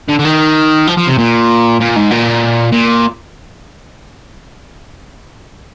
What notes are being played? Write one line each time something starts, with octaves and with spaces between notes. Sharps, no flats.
D3
D3
D#3
F3
F3
C3
A#2
A#2
G#2
A#2
A#2